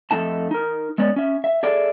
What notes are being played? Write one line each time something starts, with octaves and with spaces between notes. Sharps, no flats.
F2 A3 D#4 A5
D#4 A#4
G#3 B3 C#4 D5
C#4 E5
E5
G#4 A4 D5 E5